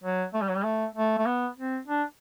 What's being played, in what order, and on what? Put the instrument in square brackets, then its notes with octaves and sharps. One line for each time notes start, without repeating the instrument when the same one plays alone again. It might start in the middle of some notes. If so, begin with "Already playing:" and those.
[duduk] F#3
A3
G3
F#3
G3
A3
A3
A3
B3
C4
D4